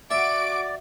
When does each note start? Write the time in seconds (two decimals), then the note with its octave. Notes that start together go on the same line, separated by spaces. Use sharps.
0.11 F#4 D5 E5 D6 D7